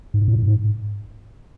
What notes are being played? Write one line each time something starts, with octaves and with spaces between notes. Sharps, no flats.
G#2
A2
G#2